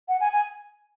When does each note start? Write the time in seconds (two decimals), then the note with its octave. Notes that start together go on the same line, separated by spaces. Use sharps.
0.08 F#5
0.20 G#5
0.32 G#5